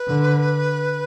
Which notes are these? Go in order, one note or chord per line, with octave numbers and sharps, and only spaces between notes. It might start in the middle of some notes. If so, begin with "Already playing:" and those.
Already playing: B4
D3